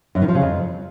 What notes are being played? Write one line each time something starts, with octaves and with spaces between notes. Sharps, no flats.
F#2
D#3
F3
C#3
F2